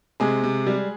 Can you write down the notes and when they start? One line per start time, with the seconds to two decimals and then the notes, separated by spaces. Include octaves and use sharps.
0.20 C3 G#3 G#4
0.44 C3
0.67 G3